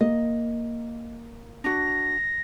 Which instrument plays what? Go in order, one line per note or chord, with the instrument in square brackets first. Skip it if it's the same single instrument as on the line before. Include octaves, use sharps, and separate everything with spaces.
[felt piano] A#3 [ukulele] D#5
[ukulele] D4 F#4 [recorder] A#6